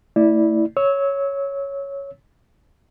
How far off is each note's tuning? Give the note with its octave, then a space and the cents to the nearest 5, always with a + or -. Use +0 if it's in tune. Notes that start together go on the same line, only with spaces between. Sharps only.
A3 +25 E4 -15 D5 +0
C#5 +0 E6 -25